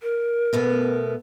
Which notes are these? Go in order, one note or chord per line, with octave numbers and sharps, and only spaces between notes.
A#4
B2 A3 B3